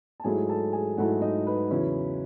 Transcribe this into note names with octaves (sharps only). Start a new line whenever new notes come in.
A5
G#2 F#3 A3 E4 G#4 G#5
A4 A5
G#4 G#5
G#2 F#3 A3 E4 F#4 F#5
D#4 D#5
B4
E2 C#3 F#3 C#4 E4